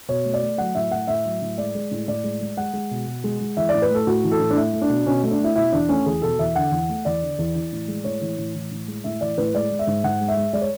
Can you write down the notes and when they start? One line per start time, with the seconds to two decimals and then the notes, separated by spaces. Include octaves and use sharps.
0.08 B2 C#5
0.25 A3
0.34 D5
0.42 A3
0.58 F#3 F#5
0.75 A2 E5
0.91 A3 F#5
1.08 A2 E5
1.25 F#3
1.42 A2
1.58 G#3 D5
1.75 G#3
1.91 A2
2.08 A2 D5
2.24 G#3
2.41 G#3
2.57 G#3 F#5
2.73 G#3
2.91 B2
3.07 B2
3.24 G#3
3.40 G#3
3.57 E3 E5
3.69 A2 D5
3.82 B4
3.90 A3 A4
4.07 A2 F#4
4.24 E3
4.31 A4
4.40 A2
4.51 D4
4.56 A3 E4
4.73 A3
4.82 D4
4.89 B2
5.06 B2 C#4
5.23 A3
5.31 D4
5.39 A3 E4
5.56 B2 E4
5.72 E2 D4
5.89 A3 C#4
6.06 E2 G#4
6.22 B2 A4
6.39 E2 E5
6.55 D3 F#5
6.72 E2
6.89 A3
7.05 E2 D5
7.22 D3
7.39 E2
7.55 E3
7.72 A2
7.88 G#3
8.04 A2 C#5
8.21 E3
8.38 A2
8.55 E3
8.71 A2
8.88 G#3
9.04 A2 E5
9.21 E3 D5
9.38 A2 B4
9.54 G#3 D5
9.71 G#3
9.79 E5
9.87 G#2
10.04 G#2 F#5
10.21 G#3
10.28 E5
10.37 G#3
10.53 G#3 D5
10.62 C#5